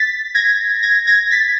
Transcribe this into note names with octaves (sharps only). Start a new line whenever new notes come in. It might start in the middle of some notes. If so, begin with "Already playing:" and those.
Already playing: A6 B6
G#6 A#6
G#6 A#6
G#6 A#6
A6 B6